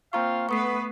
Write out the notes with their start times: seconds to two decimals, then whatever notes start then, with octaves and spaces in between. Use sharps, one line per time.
0.13 A#3 C4 F4 F5 A#5 C#6
0.49 A3 B3 B4 C#6 D#6 C7